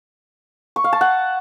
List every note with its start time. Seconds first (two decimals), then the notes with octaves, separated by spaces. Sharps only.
0.76 C#6
0.84 F5
0.93 A5
1.01 F#5